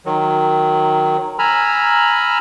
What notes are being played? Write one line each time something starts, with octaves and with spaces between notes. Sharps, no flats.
D#3 F#3
G#5 A#5 B5 E6 F6